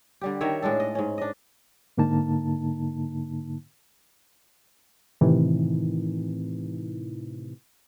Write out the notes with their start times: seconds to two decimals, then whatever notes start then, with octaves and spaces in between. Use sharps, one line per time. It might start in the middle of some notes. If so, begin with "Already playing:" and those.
0.21 D3 G3 G4
0.41 D#3 A#4 C#5 E5
0.62 A2 G#3 D4 A4
0.80 D#5
0.95 G#2 C#4
1.18 D4 D#5
1.98 G#2 D3 A#3 D#4 A5
5.21 A2 C3 D#3 E3